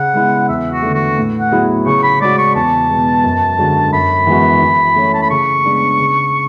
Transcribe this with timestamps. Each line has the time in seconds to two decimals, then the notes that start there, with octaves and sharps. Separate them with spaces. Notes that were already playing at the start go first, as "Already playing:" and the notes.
Already playing: C#3 F#5
0.14 G#3 B3 E4 G#4
0.49 E2 E5
0.71 F#4
0.82 D3 A3
0.95 F#4
1.18 A2
1.40 F#5
1.52 F#3 B3 E4 G#4
1.86 C#3 C#6
2.03 B5
2.21 G#3 C#4 F#4 D5
2.38 C#6
2.55 E2 A5
2.89 B2 G#3
3.24 F#2
3.59 D3 G#3 D4 F#4
3.93 F#2 B5
4.27 E3 G#3 B3 F#4
4.62 E3
4.96 A3 C#4
5.14 A5
5.22 B5
5.30 C#3 C#6
5.64 G#3 B3 D4 G#4
6.00 C#3